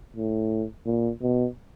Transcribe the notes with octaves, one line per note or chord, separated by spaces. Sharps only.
A2
A#2
B2